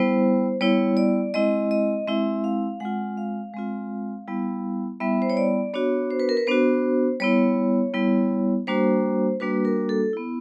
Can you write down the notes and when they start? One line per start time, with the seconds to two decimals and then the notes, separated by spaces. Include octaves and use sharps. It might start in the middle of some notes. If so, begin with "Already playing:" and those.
Already playing: G3 B3 E4 C5
0.61 G3 B3 E4 C#5
0.97 D5
1.34 G#3 C4 E4 D#5
1.71 D#5
2.07 G#3 C4 E4 E5
2.44 F5
2.80 G#3 C4 F4 F#5
3.17 F5
3.54 G#3 C4 F4
4.28 G3 B3 E4
5.00 G3 B3 E4 E5
5.22 C5
5.30 C#5
5.37 D5
5.73 B3 D4 F#4 C#5
6.10 C5
6.20 B4
6.29 A#4
6.37 B4
6.47 B3 D4 F#4 C5
7.20 G3 B3 E4 C#5
7.94 G3 B3 E4
8.67 G3 A#3 D4 F#4 C5
9.40 G3 A#3 D4 F#4 B4
9.65 A#4
9.89 A4
10.13 B3 E4